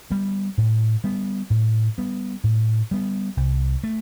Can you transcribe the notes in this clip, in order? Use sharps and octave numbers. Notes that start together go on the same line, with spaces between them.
G3 B3
A2
G3 B3
A2
G3 B3
A2
G3 B3
C2
A3